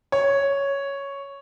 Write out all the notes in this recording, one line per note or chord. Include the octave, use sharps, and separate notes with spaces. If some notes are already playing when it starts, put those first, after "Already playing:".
C#5